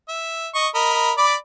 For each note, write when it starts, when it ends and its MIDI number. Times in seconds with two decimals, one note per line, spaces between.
0.08 0.48 76
0.54 0.68 75
0.54 0.68 85
0.75 1.12 70
0.75 1.12 75
0.75 1.12 83
1.17 1.35 74
1.17 1.35 83
1.17 1.35 86